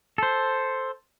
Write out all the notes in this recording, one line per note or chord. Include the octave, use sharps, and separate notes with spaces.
A4 C5